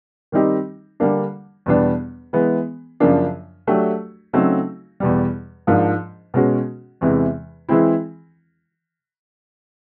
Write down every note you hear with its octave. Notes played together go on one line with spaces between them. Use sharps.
D#3 G3 C4 D#4 G4
D3 G3 A#3 D4
E2 B2 G3 B3 D4
E3 G#3 B3
F#2 C#3 F3 A#3 D4
F#3 A3 D4 G4
C#3 F#3 A3 C4 D#4
E2 B2 G3
G#2 F3 A#3 D4
B2 G#3 C#4 F#4
E2 C3 E3 G#3
E3 G#3 C4 E4